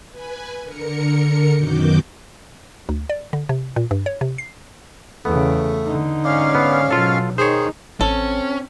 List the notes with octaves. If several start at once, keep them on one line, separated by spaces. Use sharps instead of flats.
B4 G#5
D3 A#4 C#7
F#2 B2 D#3 F#4 D6 G6
D2
D5
D3
C3
A#2
G2
C#5
C3
C7
E2 C#3 A3 B3
D3 D#4
G#2 C#4 D5 F5
B3
B2 F#3 F4 A4
D#3 D#4 G#4 C5 C#5
A1 C4 C#4 A4